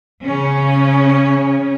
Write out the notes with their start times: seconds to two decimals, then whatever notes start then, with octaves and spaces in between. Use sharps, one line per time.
0.24 C#3 C#4